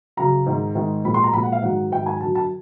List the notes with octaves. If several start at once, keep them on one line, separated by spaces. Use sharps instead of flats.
F#2 C#3 F#3 A#5
G#2 D#3 G#3
G#2 D#3 G#3
A#2 F3 G#3 B5
C6
A#5
A#2 F3 G#3 B5
F#5
F5
G#2 D#3 F#3 F#5
G#2 D#3 F#3 G5
G#5
F#2 D3 F#3 A5
A5